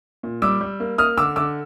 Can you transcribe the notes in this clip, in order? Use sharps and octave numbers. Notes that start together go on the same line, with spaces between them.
A#2
G3 D6 E6
G3
A#3
A#3 D#6 F6
D3 D6 E6
D3 D6 E6